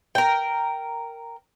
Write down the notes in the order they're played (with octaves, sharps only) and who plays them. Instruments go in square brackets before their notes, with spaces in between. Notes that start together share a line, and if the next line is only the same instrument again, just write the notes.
[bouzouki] A#4 G5